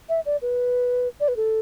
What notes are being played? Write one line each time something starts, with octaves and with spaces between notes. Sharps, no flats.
E5
D5
B4
D5
B4
A4